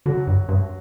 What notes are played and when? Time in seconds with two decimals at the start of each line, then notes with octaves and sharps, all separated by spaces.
0.06 D3 F#3 F#4
0.27 G2
0.49 G2